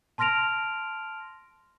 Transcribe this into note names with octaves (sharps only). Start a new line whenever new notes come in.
A5 C6 F6 A#6 D7 F7